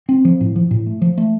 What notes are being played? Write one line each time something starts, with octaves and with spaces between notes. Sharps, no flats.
C4
F3
A2
F3
A2
A3
F3
A3